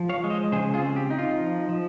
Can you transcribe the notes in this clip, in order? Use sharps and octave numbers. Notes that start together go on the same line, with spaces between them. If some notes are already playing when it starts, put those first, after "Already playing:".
Already playing: F3
C#5 F5
G#3
C5 D#5
C#3 G#4 C5
F4 G#4
C4
G4
D#4
F4
F3
F3